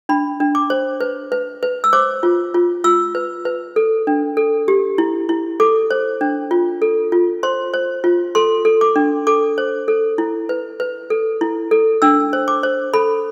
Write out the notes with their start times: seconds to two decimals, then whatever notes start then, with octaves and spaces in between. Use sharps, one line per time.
0.09 D4 B5
0.40 D4
0.55 D6
0.70 C5
1.00 B4
1.32 B4
1.63 B4
1.84 E6
1.93 C5 D6
2.23 F4
2.54 F4
2.84 F4 E6
3.15 B4
3.45 B4
3.76 A4
4.07 D4
4.37 A4
4.68 G4
4.98 E4
5.29 E4
5.60 A4 D6
5.91 C5
6.21 D4
6.51 F4
6.82 A4
7.12 F4
7.43 C5 C6
7.74 C5
8.04 F4
8.35 A4 C6
8.65 A4
8.81 D6
8.96 D4
9.27 A4 D6
9.58 C5
9.88 A4
10.18 E4
10.49 B4
10.80 B4
11.10 A4
11.41 E4
11.71 A4
12.02 D4 E6
12.33 C5
12.48 D6
12.63 C5
12.94 A4 B5